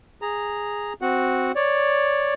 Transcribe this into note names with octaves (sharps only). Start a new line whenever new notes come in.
G#4 A#5
C4 F#4 F#5
C#5 D5